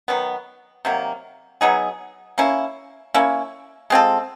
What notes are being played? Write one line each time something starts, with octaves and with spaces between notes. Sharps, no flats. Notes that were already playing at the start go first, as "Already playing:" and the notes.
D#3 F#3 B3
C3 D#3 F#3 A#3
F#3 B3 D#4 G#4
A#3 C#4 E4
A#3 C#4 E4
G#3 C4 F4 A4